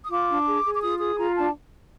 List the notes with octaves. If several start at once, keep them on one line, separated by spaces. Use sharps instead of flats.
D#6
F4 D6
D4
G#4
G#4
D6
F4 D#6
G#4 D#6
F4 A#5
D4 A5